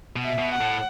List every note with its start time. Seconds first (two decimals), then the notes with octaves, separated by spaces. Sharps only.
0.16 B2
0.24 E5
0.38 B2
0.54 F#5
0.61 A2